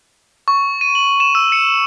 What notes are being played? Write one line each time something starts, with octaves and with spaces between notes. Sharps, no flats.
C#6
D#7
F#7
E7
E6
C#7